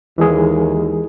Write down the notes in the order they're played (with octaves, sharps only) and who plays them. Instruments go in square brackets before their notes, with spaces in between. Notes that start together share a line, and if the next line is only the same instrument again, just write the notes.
[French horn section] D#2 [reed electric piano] E3 G#3 G#4